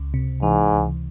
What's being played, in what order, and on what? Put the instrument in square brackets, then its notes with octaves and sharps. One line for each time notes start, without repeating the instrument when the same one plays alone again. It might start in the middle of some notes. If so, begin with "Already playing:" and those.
Already playing: [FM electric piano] C#2
C3
[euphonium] G#2 [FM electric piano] E3
[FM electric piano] C#2